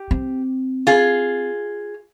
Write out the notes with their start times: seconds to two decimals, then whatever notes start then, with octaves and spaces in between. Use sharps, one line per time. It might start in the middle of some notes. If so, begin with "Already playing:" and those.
Already playing: G4
0.11 C4
0.87 F4 G#4